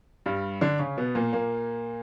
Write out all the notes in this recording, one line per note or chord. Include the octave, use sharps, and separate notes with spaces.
G2 G3
D3 D4
C#3 C#4
B2 B3
A#2 A#3
A#2 A#3